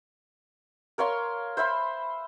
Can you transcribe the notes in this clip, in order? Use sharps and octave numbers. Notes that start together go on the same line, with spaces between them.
A#4 C#5 F5 C6
C5 E5 B5 C6